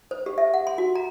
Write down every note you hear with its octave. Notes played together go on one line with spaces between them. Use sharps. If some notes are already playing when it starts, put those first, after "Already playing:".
C5
G4
E5
F#5
C6
F#4
A#5